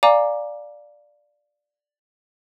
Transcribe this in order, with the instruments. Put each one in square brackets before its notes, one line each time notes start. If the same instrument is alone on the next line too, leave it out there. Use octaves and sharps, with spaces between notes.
[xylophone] D5 F5 G#5 A#5 D6